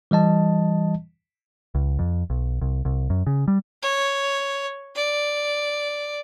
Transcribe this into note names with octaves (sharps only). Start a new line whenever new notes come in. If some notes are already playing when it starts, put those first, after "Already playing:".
E3 G3 D#5 A5
C#2
F2
B1
C2
C2
F#2
C#3
G3
C#5
D5